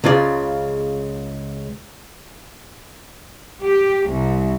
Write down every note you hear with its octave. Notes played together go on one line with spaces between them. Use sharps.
C#2 C#3 F4 D5
G4
C2